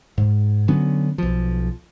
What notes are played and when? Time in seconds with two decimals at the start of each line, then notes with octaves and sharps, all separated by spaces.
0.18 G#2
0.68 D3 F#3 B3 C#4
1.18 B1 F3